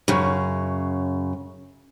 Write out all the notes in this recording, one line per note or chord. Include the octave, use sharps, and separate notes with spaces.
F#2 C#3